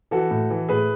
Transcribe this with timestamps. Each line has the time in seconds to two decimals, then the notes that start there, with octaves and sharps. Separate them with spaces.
0.11 E3 F#4 A4
0.31 A2
0.50 E3
0.69 A2 G#4 B4